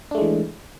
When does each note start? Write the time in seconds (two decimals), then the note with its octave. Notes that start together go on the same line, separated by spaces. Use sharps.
0.11 D4
0.15 A3
0.18 G#3
0.21 E3